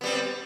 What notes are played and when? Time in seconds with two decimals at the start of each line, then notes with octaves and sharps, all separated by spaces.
0.01 B3
0.03 G3
0.06 C4